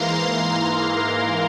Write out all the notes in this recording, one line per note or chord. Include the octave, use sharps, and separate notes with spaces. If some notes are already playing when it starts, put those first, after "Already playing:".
Already playing: G#2 E3 A#3 F5 A#5 C6
A#4